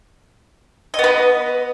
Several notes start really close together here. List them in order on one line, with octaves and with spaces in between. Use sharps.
D#5 B3 B4